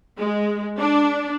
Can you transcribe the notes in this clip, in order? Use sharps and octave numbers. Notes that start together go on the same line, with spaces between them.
G#3
D4